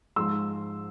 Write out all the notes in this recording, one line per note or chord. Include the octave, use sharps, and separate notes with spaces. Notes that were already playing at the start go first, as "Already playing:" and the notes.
G#2 F3 G#3 C6 E6